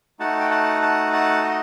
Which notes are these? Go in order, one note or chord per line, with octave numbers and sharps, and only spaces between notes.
A3 D#4 F#4 F#5 A5
G5
F#5 A5
F#5 A5
F#5 A5
D#5 F#5